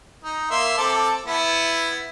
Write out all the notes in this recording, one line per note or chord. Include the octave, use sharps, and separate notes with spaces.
D#4
A#3 E5 C6
C4 A4 D6
B3 E4